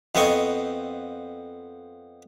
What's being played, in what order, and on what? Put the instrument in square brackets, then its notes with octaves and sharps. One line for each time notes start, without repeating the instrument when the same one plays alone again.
[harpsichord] F2 B3 C4 D#5 C#6